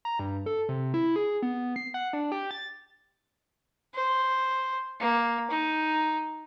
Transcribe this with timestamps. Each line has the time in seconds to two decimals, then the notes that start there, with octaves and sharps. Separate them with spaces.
0.05 A#5
0.19 G2
0.46 A4
0.69 C3
0.94 E4
1.16 G#4
1.42 B3
1.76 C7
1.94 F#5
2.13 D4
2.32 G4
2.51 A6
3.94 C5
5.00 A#3
5.50 D#4